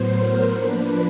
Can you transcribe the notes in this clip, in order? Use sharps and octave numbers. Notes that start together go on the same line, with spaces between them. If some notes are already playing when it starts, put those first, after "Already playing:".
Already playing: A2 F#3 B3 C5
A#4
F3 A#3 D4 B4